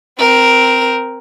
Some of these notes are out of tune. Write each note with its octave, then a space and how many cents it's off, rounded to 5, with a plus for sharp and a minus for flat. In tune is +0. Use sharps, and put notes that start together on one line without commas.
C4 -10 A#4 +5